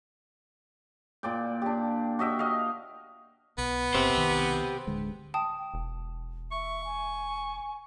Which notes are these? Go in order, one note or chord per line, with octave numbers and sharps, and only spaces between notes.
A#2 D5 G5
D4 G4
F#4 D#5 E5 G5
D#5 F5
B1 B3
F#1 C4 G4 C5
B1 D#3
D1 D3 G#3
G5 A5 D#6
E1
E5 C#6
G#5